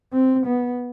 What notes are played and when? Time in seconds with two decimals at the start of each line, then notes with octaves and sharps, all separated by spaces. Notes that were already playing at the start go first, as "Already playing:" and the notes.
0.12 C4
0.47 B3